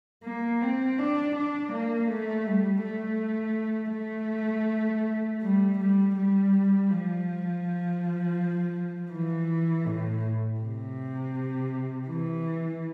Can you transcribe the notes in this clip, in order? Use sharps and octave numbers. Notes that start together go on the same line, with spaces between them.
A#3
C4
D4
D4
A#3
A3
G3
A3
A3
G3
G3
G3
F3
E3
A2
C3
E3